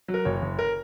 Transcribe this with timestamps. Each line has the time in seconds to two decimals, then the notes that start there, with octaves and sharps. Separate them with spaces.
0.08 F#3
0.14 A#4
0.25 F#1 C#5
0.42 F#1
0.59 A#4